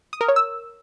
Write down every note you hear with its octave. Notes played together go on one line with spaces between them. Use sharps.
D#6
A#4
C#5
E6